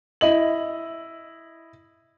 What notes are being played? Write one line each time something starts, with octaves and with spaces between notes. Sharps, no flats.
E4 D#5 F#7